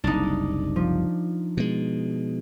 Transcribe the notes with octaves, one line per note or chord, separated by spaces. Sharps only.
F#1 C2 D4 D#4
F3
B2 G#3